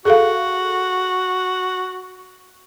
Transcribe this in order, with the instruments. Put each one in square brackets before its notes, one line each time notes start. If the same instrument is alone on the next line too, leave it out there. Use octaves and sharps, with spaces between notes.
[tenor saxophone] F#4 [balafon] G#4 A4 F5